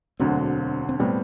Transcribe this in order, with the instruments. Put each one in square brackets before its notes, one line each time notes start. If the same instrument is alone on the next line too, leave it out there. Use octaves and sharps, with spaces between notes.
[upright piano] E1 D2 D3 F#3 [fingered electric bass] C4
[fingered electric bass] C4
[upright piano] A2 G3 C4 [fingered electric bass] B3